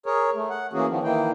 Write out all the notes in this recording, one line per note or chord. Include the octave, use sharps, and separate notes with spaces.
G#4 A#4 C#5
A3
F#5
E3 A#3 C#4 F#4 G#4
D#3 F3 B3
D#3 E3 A#3 E4 G5